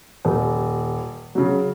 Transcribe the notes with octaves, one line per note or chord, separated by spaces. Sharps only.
D#1
C#3 F#3